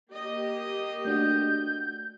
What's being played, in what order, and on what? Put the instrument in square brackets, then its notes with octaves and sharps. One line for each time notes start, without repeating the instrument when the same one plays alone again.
[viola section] A#3 G4 D#5
[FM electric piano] A3 D4 F#4 [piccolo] G6